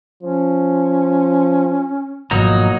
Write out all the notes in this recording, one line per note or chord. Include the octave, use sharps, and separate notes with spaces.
F3 C#4
G#1 B2 F3 F#3 A#3 D#4